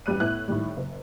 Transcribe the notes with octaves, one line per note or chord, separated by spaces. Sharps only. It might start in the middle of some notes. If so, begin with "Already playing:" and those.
A1 F#2 G3 F#6 D#7
A2 B3 E4 F#6
A2 D#3 G3
F#1